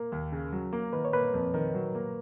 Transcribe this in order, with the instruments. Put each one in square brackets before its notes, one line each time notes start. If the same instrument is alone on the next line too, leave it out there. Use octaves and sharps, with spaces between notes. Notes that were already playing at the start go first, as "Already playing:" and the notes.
Already playing: [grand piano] A#3 [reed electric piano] A#4
[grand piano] D#2
C#3
F#3
A#3
[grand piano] D#3 [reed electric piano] B4
[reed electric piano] C#5
[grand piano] A#3 [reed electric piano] B4
[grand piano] F2
[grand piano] D#3 [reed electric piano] A#4
[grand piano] F#3
A#3